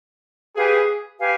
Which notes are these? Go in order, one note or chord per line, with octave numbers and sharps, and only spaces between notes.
G4 G#4 B4 F5 G#5
G4 B4 F5 G#5